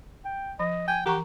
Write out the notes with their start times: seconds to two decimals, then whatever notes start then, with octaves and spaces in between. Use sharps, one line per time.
0.25 G5
0.59 F3 D#5
0.88 G5 G#5
1.06 E3 G4 F#5 A#5 C#6